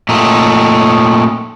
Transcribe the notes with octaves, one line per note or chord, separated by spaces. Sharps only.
A#2 A3 D#4